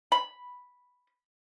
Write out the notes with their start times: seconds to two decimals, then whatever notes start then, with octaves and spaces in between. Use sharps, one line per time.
0.12 B5